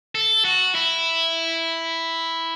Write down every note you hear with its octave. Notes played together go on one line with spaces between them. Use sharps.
A4
F#4
E4